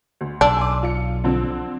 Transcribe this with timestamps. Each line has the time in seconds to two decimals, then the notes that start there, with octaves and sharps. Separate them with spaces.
0.21 D2
0.41 B1 D4 C6 E6
0.57 G#5 C6 D6
0.83 F4 C#7
1.24 D3 F3 C4